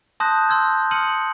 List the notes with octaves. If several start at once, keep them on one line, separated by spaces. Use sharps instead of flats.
A5 C6 D#6 F#6 G6 A#6
C6 E6 G6 G#6
C6 D#6 F6 C#7 D#7 F#7